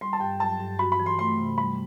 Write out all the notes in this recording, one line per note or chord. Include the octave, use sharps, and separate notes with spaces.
G3 C6
A5
G2 G5
F#3 A5
G2
F#4 B5
B5
E3
C6
A3 C6
C3
G3 B5